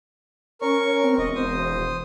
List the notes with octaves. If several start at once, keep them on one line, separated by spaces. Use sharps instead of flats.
C#4 A#4 C#6
C4
E1 D#5
C5 D#6